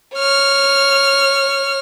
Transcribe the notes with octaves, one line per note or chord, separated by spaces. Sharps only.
C#5 F6